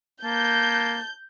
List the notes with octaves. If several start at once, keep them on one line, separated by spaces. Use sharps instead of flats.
A#3 A5 G6